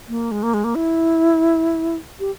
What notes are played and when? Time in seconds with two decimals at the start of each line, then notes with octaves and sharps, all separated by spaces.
0.09 A#3
0.31 G#3
0.43 A#3
0.54 G#3
0.64 A#3
0.75 E4
2.20 G4